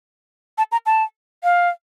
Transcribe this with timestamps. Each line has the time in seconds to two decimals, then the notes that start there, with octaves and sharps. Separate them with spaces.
0.58 A5
0.72 A#5
0.86 A5
1.44 F5